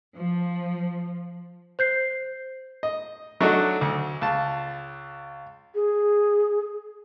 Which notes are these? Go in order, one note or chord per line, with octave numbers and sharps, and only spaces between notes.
F3
C5 G6 C7
D#5
F#3 A3 D4 D#4 F#4
D2
C#2 A5
G#4